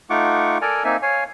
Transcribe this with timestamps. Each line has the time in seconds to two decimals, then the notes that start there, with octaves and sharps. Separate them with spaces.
0.10 A3 D#4 F4 F#5 C#6 D6
0.62 A4 A#4 D5 G#5 A#5
0.84 A#3 C4 D#4 E5 G#5
1.02 C#5 F5 G#5